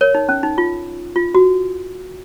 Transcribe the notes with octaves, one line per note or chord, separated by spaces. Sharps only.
A#4 C#5
D#4
C#4
D#4
F4
F4
F#4